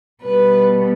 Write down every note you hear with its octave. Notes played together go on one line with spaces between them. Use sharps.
B2 G3 B3 B4